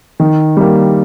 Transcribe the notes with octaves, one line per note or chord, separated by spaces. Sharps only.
D#3
G3 A#3